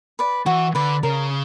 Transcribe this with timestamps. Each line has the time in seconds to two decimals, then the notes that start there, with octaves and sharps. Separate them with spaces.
0.19 B4 D5
0.46 E3 F#4
0.75 D3 B4 D5
1.03 C#3 A#4